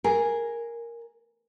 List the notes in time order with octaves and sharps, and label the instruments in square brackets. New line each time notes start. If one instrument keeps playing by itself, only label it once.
[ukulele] G#4 [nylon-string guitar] A#4